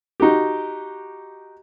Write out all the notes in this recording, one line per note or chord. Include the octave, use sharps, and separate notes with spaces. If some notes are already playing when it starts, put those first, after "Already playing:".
D#4 F#4 G4